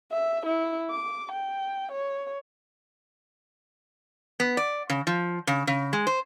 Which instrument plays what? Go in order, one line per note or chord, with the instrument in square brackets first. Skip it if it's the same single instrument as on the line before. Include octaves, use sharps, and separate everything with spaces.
[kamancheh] E5
E4
D6
G5
C#5
[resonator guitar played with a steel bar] B3
D5
C#3
F3
C#3
C#3
G#3
C5